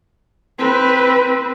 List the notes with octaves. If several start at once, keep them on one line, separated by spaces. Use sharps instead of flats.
C4 B4